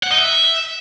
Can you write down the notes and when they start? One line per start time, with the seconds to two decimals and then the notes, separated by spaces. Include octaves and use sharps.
0.04 F#5
0.11 D#4
0.18 E5